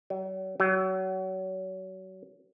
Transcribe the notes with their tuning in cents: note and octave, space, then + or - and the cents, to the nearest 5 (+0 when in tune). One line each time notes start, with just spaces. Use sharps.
F#3 +40
F#3 +30